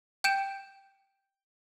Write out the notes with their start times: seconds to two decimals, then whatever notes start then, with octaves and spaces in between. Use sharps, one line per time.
0.24 G5 G6 D7 E7